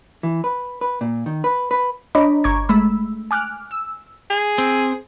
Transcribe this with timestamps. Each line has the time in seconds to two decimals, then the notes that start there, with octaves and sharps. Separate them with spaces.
0.23 E3
0.44 B4
0.81 B4
1.01 A#2
1.26 D#3
1.44 B4
1.71 B4
2.15 D4 C#5 D#5 A#5 B5 D6
2.44 G1 A#5 C#6 D6 G#6
2.69 G#3 A3 B5 E6
3.31 G#5 D6 F6 F#6
3.71 E6
4.30 G#4
4.58 C4